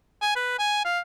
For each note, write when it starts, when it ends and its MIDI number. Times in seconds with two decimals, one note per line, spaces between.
0.22 0.35 80
0.36 0.55 71
0.59 0.82 80
0.85 0.99 77